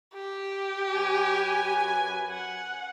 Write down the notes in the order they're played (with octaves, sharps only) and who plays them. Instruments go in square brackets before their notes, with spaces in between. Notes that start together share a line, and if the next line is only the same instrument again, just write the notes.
[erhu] G4
[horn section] F#2 B4 G#5
[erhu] F#5